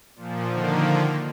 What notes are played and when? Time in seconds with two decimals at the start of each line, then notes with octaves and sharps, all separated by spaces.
0.16 A#2 F3
0.49 D3 D#3 F3 A#3